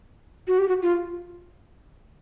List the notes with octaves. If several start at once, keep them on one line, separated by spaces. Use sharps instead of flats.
F#4
G4
F#4
F4